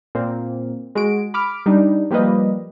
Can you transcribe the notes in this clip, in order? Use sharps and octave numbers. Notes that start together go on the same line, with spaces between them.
A#2 A#3 C4
G#3 F#4 D7
B5 D6 F6 D7
G3 D4 D#4
F3 G3 A#3 G4 B4 D#5